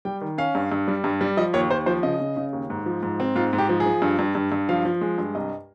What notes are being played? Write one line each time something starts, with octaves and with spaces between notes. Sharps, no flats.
G3 G5
D#3
C#4 F5
G2
G2
G3
G2
G3
F3 D#5
D#2 C#5
D#2 C5
F3 C5
C#3 D#5
C#3
C#3
D#2
G#2
F3
G#2
C4
G#2 F4
G#2
G4
F3
G#4
F3
G2
G2
G2
G2
F3 F5
F3
G#3
G2
C2 D#5